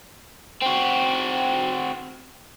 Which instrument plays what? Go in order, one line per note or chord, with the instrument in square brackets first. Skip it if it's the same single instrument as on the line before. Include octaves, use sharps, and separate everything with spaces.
[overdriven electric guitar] C4 F#4